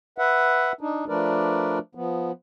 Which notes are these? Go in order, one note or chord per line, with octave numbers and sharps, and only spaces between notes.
B4 E5 F#5
D4 D#4
F3 A3 D4 A#4 B4 D5
F3 B3